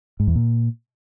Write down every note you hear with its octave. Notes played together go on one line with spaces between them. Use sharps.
G#2
E2
A#2